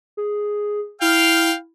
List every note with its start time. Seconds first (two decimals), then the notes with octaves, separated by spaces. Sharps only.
0.17 G#4
1.01 E4 F5 G5 F6